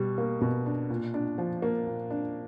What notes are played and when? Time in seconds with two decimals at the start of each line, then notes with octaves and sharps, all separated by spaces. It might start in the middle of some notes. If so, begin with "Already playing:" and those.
Already playing: B2 G3
0.18 A#3
0.41 B2
0.66 D4
0.90 A#2
1.14 D4
1.38 F3
1.62 A#3
1.87 A#2
2.10 D4